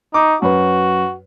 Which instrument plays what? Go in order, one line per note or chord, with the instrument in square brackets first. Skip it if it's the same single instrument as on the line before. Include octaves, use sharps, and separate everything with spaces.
[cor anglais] D#4 [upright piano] D6
[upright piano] F#2 B4 [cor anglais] F#4